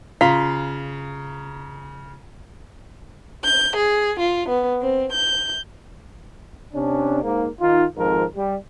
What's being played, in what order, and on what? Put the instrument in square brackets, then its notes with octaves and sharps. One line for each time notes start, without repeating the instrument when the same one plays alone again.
[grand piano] C#3 A#5 B6 [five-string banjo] F4
[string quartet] G6
G#4
F4
B3
C4
G6
[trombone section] C3 C#4 D4
G#2 A#3
D#3 D#4 F4
G#1 F2 G#2 F3 A#4
G3